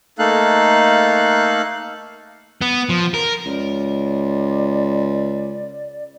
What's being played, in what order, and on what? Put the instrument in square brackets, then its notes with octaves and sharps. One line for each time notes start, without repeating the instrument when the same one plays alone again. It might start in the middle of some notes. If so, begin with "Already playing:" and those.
[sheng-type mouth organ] A3 A#3 D#4 A4 F5 F#6
[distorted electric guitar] B3
F3
A#4
[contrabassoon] C#2 [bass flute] D5